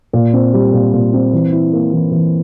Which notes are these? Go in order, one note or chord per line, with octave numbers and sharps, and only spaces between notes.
A#2
C4
G3
A#2
A#2
C4
E3
E4
A#3
E3
E3